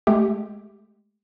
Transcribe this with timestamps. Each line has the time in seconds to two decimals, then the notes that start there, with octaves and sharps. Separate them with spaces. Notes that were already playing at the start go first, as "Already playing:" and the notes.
0.07 G#3 A3 G4